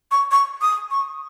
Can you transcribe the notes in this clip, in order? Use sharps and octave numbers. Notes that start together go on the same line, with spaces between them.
C#6
C#6
D#6
C#6